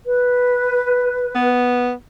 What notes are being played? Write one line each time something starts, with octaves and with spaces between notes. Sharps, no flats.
B4
B3